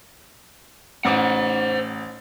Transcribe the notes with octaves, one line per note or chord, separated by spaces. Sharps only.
A1 C5 F#5 D6